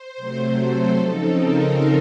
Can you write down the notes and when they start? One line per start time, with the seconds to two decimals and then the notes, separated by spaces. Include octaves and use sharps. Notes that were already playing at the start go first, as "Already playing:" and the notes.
Already playing: C5
0.17 C3 F#3 A3
0.58 A4
0.97 C#3 F3 C4 D#4
1.37 A#4